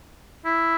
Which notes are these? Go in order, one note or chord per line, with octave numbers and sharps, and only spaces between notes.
E4